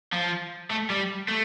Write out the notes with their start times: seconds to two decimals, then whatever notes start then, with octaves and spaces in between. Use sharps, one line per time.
0.13 F3
0.70 A3
0.90 G3
1.29 A3